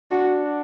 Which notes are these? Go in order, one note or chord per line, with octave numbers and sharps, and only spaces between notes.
D4 F#4